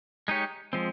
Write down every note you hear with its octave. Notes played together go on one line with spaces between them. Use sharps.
G#3 D#4 G4 C#5
F3 G#3 C4